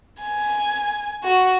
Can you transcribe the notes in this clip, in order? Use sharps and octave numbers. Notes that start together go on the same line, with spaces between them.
G#5
F#4